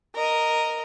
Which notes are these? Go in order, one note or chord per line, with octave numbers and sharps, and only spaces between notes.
A#4 D#5